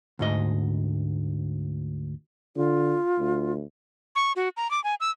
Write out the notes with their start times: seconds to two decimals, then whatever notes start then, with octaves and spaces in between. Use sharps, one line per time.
0.19 D2 G#2 D#5
2.56 D3 F4
3.19 D2
4.16 C#6
4.36 F#4
4.57 A#5
4.71 D6
4.84 G#5
5.00 E6